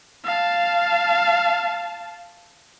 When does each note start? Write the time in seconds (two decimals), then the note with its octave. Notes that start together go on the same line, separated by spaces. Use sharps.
0.24 F5 A5